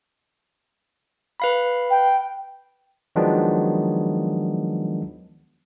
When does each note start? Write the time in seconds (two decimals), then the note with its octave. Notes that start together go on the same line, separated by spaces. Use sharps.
1.40 B4 F5 B5
1.90 G5
3.16 D#3 F3 F#3 G#3 B3 D4